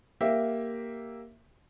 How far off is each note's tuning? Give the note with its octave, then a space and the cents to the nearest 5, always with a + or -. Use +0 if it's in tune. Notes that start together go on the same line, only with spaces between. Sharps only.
A#3 +0 G4 +0 E5 +0